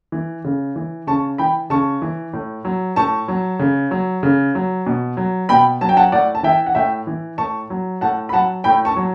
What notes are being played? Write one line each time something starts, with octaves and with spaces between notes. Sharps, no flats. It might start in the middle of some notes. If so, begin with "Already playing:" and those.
E3
C#3
E3
C#3 A5 C#6
E3 G5 B5
C#3 A5 C#6
E3
A2
F#3
A2 A5 C#6
F#3
C#3
F#3
C#3
F#3
B2
F#3
B2 G5 B5
F#3 A5
G5
F#5 A5
A2 D5 F#5
A5
E3 E5 G5
F#5
A2 E5 G5
E3
A2 A5 C#6
F#3
A2 F#5 A5
B5
F#3 F#5 A5
A2 G5 B5
A5 C#6
F#3